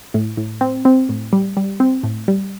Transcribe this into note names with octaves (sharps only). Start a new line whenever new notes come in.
A2
A2
C4
C4
A2
G3
G3
C4
A2
G3